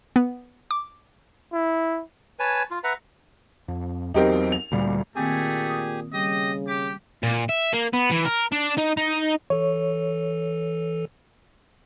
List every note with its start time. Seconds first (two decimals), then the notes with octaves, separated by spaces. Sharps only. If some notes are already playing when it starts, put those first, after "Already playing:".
0.16 B3
0.71 D6
1.53 E4
2.39 B4 C#5 G#5 A5
2.71 F4
2.84 B4 E5 F#5 A#5
3.68 F2
4.14 E2 F#3 C4 D#4 G4 A#4
4.52 F7
4.72 D2 A#2 G3
5.16 A#2 D#3 A3 A#3 C4 G4 G#4 G#5
5.69 D#6
6.13 C#3 G3 G4 D#5
6.67 G4 D6
7.23 A#2
7.49 E5
7.73 A#3
7.94 B3
8.11 E3
8.25 A#4
8.52 D4
8.77 D#4
8.97 D#4
9.50 E3 A4 C#5